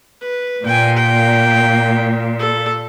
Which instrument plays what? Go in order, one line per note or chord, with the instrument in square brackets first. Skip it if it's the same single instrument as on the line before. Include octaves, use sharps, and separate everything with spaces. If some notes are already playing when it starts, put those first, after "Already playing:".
[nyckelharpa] B4
[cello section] A#2 [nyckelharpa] G5 G#5
[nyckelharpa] G5
A4